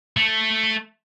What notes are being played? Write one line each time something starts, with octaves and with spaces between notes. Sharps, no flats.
A3